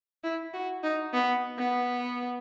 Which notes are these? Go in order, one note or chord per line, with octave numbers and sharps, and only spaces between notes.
E4
F#4
D#4
B3
B3